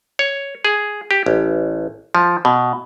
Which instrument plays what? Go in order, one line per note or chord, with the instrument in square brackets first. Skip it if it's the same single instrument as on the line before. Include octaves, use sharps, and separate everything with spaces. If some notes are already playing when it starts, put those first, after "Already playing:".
[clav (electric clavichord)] C#5
G#4
G4
A1
F3
B2